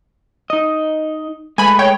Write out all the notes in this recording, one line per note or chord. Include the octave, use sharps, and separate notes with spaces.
D#4 D#5
G#3 A3 B4 G#5 B5
C#5 G5